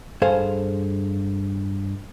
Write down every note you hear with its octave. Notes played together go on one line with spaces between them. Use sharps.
G2 G#4 A4 C5 F5